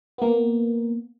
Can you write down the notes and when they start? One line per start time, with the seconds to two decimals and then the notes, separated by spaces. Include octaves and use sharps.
0.18 A#3 B3